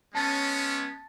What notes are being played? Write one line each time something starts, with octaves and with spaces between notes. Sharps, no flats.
G#3 B3 C#4 A5 A6